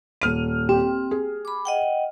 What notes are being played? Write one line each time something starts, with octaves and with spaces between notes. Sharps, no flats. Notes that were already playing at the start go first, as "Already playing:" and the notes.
D#1 F6 D#7
C4 G4
G#4
B5 D6
D#5 F#5 G5